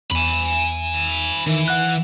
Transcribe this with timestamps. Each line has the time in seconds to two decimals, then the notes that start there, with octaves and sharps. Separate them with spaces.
0.12 E2 G#5 B5
1.47 D#3 E3
1.68 F#5 F#6